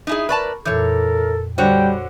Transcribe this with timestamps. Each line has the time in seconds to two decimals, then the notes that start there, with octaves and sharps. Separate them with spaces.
0.07 D#4 E4 G#4
0.29 A#4 B4 D5 A5 B5 C#6
0.65 F2 A#2 E3 A4 A#4 C#5 G6
1.58 D3 G3 F#4 C5 C#5 G5